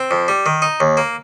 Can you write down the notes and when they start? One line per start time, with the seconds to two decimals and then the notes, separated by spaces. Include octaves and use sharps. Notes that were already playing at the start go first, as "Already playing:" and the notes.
Already playing: C4
0.11 F2
0.28 G3
0.46 D#3
0.62 D#4
0.80 D#2
0.97 A#3